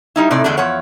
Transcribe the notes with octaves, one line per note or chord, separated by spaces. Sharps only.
G3 D#4 E4
A2 C3 D#4 D5
E2 D3 G#3 A3 D4
E2 F3 C#5 F#5